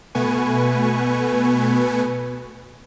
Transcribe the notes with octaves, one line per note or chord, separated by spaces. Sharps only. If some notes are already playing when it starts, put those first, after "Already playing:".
B2 A3 B3 B4 G#5 C#6